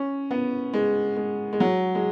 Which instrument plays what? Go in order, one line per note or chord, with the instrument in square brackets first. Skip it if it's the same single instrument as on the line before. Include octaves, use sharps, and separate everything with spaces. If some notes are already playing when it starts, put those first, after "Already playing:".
Already playing: [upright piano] C#4
B3
G#3
G#3
G#3
F#3
G#3